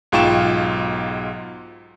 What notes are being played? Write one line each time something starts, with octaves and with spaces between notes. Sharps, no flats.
B1 G#2 F4 G5 C#6 E7